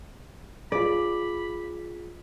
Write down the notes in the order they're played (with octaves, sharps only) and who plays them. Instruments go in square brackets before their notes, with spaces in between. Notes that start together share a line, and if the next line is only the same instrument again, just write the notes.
[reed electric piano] F4 G#4 [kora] D5 [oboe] B5